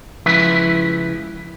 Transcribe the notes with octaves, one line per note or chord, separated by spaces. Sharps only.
C#2 F3 C#4 E4 B4 E5